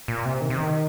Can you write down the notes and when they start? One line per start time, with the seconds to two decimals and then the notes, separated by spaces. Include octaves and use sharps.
0.08 A#2
0.25 C3
0.41 D#3
0.50 C3
0.57 D#3